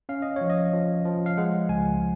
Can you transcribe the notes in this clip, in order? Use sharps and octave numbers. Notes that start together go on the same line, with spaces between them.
C#4 F5
D#5
F3 C#5
D#5
F3
F3
F5
G#3 F#5
C#2 G#5